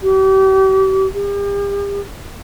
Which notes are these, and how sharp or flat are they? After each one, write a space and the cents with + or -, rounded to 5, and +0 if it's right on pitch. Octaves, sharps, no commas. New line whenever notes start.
G4 -40
G4 +40